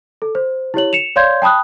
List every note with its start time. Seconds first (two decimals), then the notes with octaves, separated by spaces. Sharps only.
0.22 A4
0.35 C5
0.74 E4 G4 C#5 F#7
0.93 C#7 E7 F7
1.16 C#5 D5 F5 C6 G6 G#6
1.42 G5 A5 B5 D#6 F#6